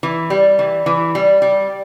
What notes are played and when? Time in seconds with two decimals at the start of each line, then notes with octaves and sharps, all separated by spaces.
0.03 E3
0.30 G3
0.59 E3
0.86 E3
1.15 G3
1.42 G3